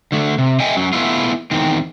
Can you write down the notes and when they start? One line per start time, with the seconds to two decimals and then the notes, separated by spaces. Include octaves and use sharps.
0.12 D3 A3
0.38 C3
0.60 D#5 E5 G5 G#5
0.77 F#2 F#3
0.93 G#3 A3 B3 E4 F4
1.51 E2 D#3 C4